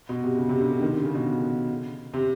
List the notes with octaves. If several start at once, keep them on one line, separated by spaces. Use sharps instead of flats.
B2
C3
C#3
C3
D3
D3
D#3
D3
C#3
B2
C3